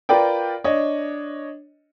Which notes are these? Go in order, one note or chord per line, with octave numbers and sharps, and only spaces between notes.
F4 A#4 B4 D5 G5
D4 C#5 D#5